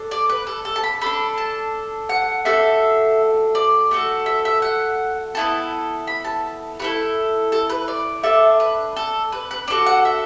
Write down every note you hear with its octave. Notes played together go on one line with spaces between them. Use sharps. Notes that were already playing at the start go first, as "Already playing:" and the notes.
Already playing: D4 A4
D5
B4
A4
A4
A5
B5
D4 A4 B5
A5
F#5
A3 D4 F#4 A4 E5
D5
A3 F#4 A4
E5
E5
F#5
B3 E4 A4 A5
B5
A5
A3 E4 A4 B4
A4
B4
D5
D4 A4 E5
B4
A4
B4
B4
D4 F#4 A4 D5
F#5
E5